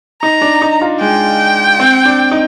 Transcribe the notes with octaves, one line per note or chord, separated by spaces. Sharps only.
D#4 A#5
D4
D#4
F4
G#3 G5
C4
D4
D#4